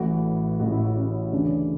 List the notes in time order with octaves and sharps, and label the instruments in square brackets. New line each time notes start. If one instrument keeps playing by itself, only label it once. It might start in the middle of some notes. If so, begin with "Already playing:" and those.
Already playing: [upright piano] A1 A2 E3 F#4
A1 A2 E3 F#4
E4
F#4
C#4
D2 C#3 E3 D4